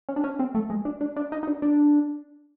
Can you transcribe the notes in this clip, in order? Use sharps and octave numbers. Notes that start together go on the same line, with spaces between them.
C#4
D4
C#4
C4
A3
G#3
D4
D4
D4
D#4
D#4
D4
D4